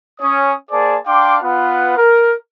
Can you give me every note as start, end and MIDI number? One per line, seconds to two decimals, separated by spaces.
0.21 0.52 61
0.21 0.52 73
0.21 0.52 87
0.71 0.97 58
0.71 0.97 68
0.71 0.97 72
0.71 0.97 74
0.71 0.97 81
0.71 0.97 86
1.07 1.37 62
1.07 1.37 77
1.07 1.37 79
1.07 1.37 84
1.07 1.37 86
1.42 1.96 59
1.42 1.96 65
1.42 1.96 71
1.42 1.96 78
1.97 2.33 70